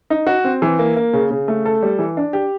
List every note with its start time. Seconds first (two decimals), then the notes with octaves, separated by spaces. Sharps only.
0.10 D#4
0.27 F#4
0.44 C4
0.62 E3
0.79 A#3
0.96 A#3
1.13 C#3
1.31 C#3
1.48 A3
1.65 A4
1.83 G3
1.99 E3
2.17 D4
2.33 G4